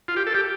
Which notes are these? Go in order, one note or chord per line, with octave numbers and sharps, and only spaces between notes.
F4
G4
A4
G4